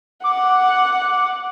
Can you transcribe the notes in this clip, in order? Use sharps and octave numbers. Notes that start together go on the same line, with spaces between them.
F#5 D6